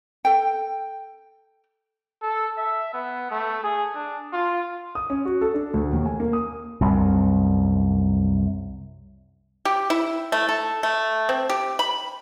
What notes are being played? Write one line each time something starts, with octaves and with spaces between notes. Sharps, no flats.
A4 G5
A4
E5
B3
A3
G#4
D4
F4
D#6
C#4
F#4
A4
D4
D2
D#2
G#5
A#3
D#6
C2 F#2
G4
E4
A3
A4
A3
C4
G4
B5